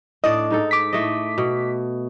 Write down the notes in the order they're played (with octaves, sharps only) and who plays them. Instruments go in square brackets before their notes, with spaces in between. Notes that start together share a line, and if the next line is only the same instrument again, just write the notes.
[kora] A2 D4 D5 [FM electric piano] D#5
[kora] G#2 D#4 A4
[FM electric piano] D6 B6
[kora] A2 A3 D#5
B2